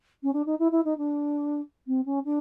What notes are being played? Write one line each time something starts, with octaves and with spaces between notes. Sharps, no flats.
C#4
D4
D#4
E4
E4
D#4
D4
C4
C#4
D4